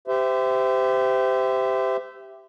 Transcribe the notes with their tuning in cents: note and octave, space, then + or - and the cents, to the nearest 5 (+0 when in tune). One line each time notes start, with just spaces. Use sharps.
G4 +0 C5 -30 E5 +0